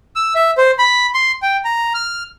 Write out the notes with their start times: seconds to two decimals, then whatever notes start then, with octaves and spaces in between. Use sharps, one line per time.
0.16 E6
0.35 E5
0.57 C5
0.79 B5
1.14 C6
1.42 G5
1.64 A#5
1.94 F6